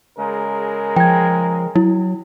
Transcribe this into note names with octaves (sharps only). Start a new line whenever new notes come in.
C#3 G#3 A#4
F3 G5 G#6
F#3 E4